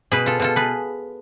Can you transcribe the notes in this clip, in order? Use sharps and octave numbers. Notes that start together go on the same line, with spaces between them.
B2 G#4 B4
F4 A4
B2 F4 A4
G#4 B4